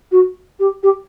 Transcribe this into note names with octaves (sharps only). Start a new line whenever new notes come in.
F#4
G4
G4